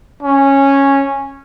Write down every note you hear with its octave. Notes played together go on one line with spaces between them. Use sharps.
C#4